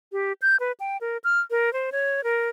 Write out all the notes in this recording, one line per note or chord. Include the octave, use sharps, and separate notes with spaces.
G4
G6
B4
G5
A#4
F6
A#4
C5
C#5
A#4